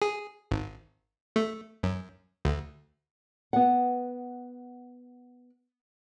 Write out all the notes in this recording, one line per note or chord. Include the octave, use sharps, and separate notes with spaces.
G#4
G#1
A3
F#2
D2
B3 F#5